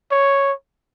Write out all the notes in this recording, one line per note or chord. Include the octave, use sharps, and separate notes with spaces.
C#5